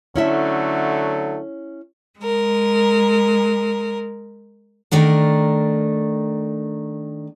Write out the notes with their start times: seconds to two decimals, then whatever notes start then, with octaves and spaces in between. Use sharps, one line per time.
0.16 D3 F#3 A3 C#4 E4 E5
2.20 G#3 A#4
4.91 D#3 A3 D4 A#4